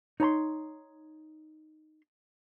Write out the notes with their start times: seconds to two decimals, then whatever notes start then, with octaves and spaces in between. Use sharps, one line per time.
0.20 D#4 C#5 A#5 C6